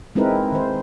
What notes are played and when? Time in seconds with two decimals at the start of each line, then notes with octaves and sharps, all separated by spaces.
0.15 G#3 C4 D#4 E4 A#4 B4
0.52 D#3 C5